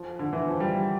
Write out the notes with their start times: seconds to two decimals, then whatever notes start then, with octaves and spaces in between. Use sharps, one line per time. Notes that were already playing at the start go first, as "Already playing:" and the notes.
Already playing: F3
0.19 D3
0.33 E3
0.47 F3
0.60 G3